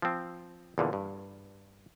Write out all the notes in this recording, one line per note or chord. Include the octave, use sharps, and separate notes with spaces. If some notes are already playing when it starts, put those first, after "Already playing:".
F3 C4
E2 A#2 D3
G2